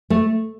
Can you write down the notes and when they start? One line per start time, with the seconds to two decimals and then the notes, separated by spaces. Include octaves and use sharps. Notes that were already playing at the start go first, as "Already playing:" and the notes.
0.10 A3